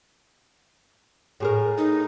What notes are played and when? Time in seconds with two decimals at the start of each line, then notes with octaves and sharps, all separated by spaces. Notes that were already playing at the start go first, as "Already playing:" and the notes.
1.40 A2 G#4 A#4
1.78 D#4